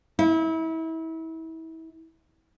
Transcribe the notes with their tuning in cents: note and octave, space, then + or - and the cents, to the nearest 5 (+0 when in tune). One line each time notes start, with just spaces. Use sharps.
E4 -30